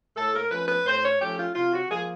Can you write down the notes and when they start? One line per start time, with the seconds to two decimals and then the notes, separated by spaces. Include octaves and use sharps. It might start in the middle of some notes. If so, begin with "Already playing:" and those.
0.17 A2 A4
0.34 A#4
0.51 F3 A3 C#4 B4
0.68 B4
0.85 A2 C5
1.03 C#5
1.20 F3 A3 C#4 G4
1.38 F4
1.55 C3 F4
1.73 F#4
1.90 F3 A#3 G#4